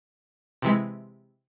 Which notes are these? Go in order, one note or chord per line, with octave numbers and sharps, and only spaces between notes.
C3 E3 G#3